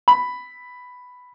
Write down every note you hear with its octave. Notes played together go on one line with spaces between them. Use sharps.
B5